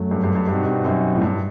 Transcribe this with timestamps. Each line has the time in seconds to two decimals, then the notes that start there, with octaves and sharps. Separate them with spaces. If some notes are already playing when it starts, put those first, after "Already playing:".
Already playing: F#2 F#3 A3
0.11 G2
0.24 G2
0.35 G2
0.48 G2 B2 G3 C4 D#4 F#4
0.66 G2
0.85 F#2
1.15 A2
1.22 G2